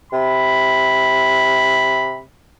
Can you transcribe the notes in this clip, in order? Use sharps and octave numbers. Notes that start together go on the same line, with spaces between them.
C3 B5